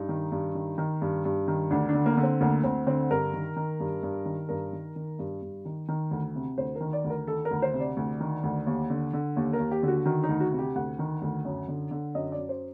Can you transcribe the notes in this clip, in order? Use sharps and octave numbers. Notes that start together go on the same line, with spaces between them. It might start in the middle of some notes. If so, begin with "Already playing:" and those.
Already playing: G2 D#4
D#3
G2
D#3
D#3
G2
G2
D#3
D2 D4
D4
D3
A#3
D3
C4
D2 A#3
D2 C4
D3 C4
G2 A#4
D#3
D#3
G2
G2
D#3
G2 A#4
D#3
D#3
G2
G2
D#3
D#3
D2
C3
D2 C5
A#4
D#3
D5
D2
A#4
D#3 A4
A#4
D2
C5
C3
D5
D2
D#3
D2
D#2
D3
D3
D#2
A#4
D#2
G4
D3 F#4
D#3 F#4
D#4
D2
F#4
C3
G4
D2 F#5
D#3
D2
F#2
D3
D3
F#2 D#5
D5
F#2
C5